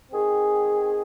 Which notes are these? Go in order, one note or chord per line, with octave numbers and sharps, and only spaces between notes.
D#3 C4 G#4